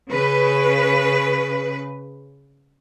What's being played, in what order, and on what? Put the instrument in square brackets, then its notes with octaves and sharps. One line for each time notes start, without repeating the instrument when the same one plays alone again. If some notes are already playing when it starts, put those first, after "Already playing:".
[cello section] C#3 B4